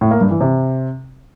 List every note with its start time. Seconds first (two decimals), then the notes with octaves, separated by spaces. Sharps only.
0.01 A2
0.11 A#3
0.21 G2
0.31 E3
0.41 C3